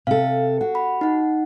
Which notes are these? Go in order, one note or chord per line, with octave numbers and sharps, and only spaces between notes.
C3 A4 F5
F#4 F#5
B5
D#4 F#5